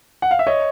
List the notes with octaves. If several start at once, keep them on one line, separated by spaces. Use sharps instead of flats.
F#5
F5
E5
C#5 D#5